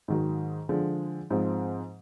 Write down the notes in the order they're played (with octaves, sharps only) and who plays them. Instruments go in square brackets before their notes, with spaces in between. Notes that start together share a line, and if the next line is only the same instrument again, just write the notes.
[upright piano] G#2 D#3 F#3
D3 F3 G#3
G#2 F3 G#3 C4